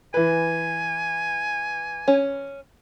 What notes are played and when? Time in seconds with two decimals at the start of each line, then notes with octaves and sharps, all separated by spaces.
0.14 E3 B4 G#5
2.08 C#4